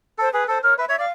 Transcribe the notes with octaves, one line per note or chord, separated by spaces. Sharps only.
A4 C5
G#4 B4
A4 C5
A#4 C#5
B4 E5
C#5 E5
D5 F5